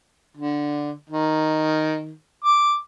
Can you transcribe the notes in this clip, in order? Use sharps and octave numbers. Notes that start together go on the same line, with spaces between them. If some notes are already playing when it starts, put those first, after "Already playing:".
D3
D#3
D6